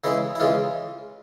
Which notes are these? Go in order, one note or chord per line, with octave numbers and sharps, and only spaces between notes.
C#3 E3 G#3 E4
E4
C#3 E3 G#3 F4